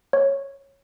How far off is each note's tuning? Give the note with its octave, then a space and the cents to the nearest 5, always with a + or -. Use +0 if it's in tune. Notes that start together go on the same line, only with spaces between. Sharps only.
C#5 -10